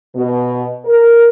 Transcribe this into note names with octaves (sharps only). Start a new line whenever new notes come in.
B2
A#4